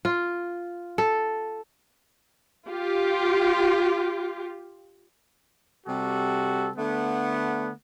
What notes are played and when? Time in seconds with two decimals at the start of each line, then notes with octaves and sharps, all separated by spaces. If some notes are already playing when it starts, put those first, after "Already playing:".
0.05 F4
0.98 A4
2.68 F4 G4
5.87 C3 G3 F#4 A4
6.76 D3 A3 B3